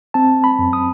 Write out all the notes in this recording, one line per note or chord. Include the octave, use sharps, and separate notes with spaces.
C4 A5
B5
F#2
D#6